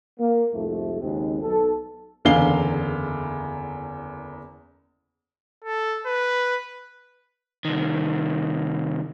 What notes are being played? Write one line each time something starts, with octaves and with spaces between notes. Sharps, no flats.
A#3
C2 F2 G#2 A3
G#1 D#2 C#3 G#3 C4
B1 A4
F#1 E2 D3 F5 C7 G7
A4
B4
C2 D#3